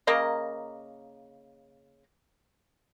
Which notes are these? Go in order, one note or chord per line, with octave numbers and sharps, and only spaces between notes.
C#3 A#3 A#4 D#5